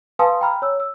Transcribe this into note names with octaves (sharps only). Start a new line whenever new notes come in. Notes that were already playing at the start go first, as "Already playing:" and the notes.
B4 F5 G#5 A5 C6 D#6
G5 G#5 A#5 B5 F6
C#5 E6
E6